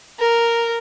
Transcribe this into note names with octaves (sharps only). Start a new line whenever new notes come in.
A#4